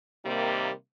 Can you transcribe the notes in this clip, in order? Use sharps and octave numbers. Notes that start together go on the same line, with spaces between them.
C3 D#3 G3 A#3